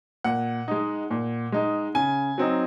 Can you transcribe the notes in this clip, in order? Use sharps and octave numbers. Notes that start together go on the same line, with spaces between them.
A#2 F#5
G#3 D#4
A#2
G#3 D#4
C#3 G#5
F#3 C4 D#4